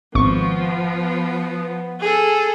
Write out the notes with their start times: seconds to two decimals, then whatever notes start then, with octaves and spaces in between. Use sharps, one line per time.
0.15 G#1 F3 B3 C#6
2.00 G#4 A4